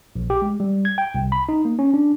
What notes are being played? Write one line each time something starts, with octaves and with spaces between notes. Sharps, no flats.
A#1
G4
G#3
G3
G#6
G5
C2
B5
D#4
A#3
C#4
D4